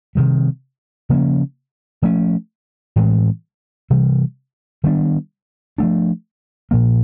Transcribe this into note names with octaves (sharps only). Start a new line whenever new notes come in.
C3 D#3 G3
C#3 F3 A#3 C#4
F3 A3 C#4
A2 E3 G#3 C4
C3 E3 G3
D#3 G3 B3 D4
F3 A3 D4
A#2 F3 A#3